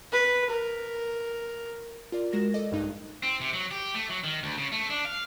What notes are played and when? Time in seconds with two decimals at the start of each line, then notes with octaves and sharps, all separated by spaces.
0.12 B4
0.50 A#4
2.12 F4 A#4 D5
2.32 G#3 F#4 A#4 A#6 E7
2.54 A4 D5 D#5
2.71 A#1 G2 D#4 F#6
3.23 C4
3.41 C3
3.53 F#3
3.71 G4
3.94 A3
4.10 F#3
4.24 D#3
4.43 D2
4.58 C#3
4.72 A3
4.90 D4
5.05 F5